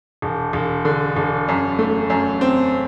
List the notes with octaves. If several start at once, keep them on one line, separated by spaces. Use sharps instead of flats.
E1
E1
D3
E1
F#2
A3
F#2
C4